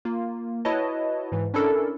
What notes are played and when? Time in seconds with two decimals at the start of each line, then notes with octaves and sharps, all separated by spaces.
0.05 A#3 F4
0.65 E4 F#4 B4 C#5 D#5 A5
1.32 G#2 E3
1.54 C#4 D4 E4 A4 A#4